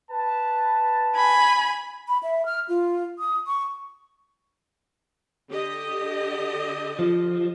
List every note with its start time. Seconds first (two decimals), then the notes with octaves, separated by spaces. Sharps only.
0.11 B4 A5
1.16 G#5 B5
2.08 B5
2.23 E5
2.45 F6
2.69 F4
3.19 D#6
3.47 C#6
5.50 D3 G4 D#5
6.99 F3